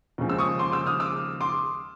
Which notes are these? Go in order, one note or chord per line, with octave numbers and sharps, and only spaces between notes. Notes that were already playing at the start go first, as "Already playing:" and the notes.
D#2 C#3 F3 G#3
E6
C#6 D#6
C6 D6
D6 E6
D#6 F6
D6 E6
C6 D6